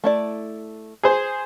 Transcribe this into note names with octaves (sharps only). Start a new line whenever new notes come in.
A3 E4 D5
G#4 C5